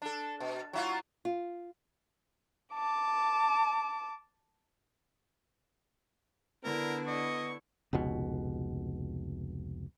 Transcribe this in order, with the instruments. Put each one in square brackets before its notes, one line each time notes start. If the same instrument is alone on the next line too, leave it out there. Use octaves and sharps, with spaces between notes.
[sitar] D4 A4
B2
F#3 E4 F4
[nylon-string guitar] F4
[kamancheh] A5 D6
[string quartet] D3 D4 [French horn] B3 [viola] E4 [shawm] A#4
[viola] E4 C#6 [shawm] D#5
[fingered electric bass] F1 C#2 B2